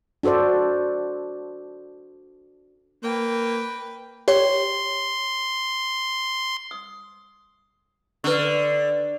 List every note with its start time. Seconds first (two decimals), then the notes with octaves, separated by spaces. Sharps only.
0.23 D4 F#4 A4 C5 D5
3.03 A#3 B4 G5
4.28 G4 C#5 C6
6.71 D#6
8.24 D3 B4 C#6